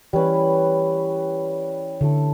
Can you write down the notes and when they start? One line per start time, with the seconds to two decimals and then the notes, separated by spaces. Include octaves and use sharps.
0.13 E3 G3 C#4 E4 B4
2.01 D3 A3 E4 A4